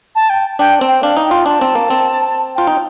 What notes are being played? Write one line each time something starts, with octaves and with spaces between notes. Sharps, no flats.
A5
G5
D4 G5
C4
G5
D4 F5
D#4
G5
F4
D4 A5
C4
A#3
C4
F4 G5
D#4